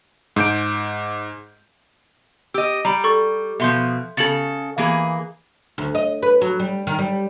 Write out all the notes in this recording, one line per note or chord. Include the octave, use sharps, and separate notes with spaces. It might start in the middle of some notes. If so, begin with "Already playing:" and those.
G#2 G6 D7
G4 D#5 E6
G3 A#5 B5
A4 C#6 A6
B2 F3 E5 C6 G6
C#3 A4 A6 C#7 F#7
E3 A#3 G#4
D2
D#5
B4
F#3
G3
D#3
G3